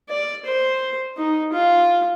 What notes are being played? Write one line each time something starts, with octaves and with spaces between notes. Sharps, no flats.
D5
C5
D#4
F4